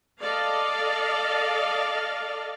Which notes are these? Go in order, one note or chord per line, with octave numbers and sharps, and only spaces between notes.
A4 D5 D#5 F5